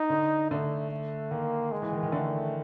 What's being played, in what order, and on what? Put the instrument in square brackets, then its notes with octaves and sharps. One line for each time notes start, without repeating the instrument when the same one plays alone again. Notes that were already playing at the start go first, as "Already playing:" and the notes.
Already playing: [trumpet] D#4
[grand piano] D3
[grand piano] D3 [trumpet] A3
[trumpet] A3
[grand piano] D#3 [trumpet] A#3
[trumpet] G#3
[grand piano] E3
D#3
D#3
[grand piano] D3 [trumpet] A3